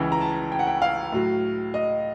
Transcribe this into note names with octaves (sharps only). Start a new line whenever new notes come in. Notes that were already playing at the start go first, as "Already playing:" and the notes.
Already playing: C#2 C#3 E3
A#5
A5
G5
F#5
G5
F5
A2 F#3
D#5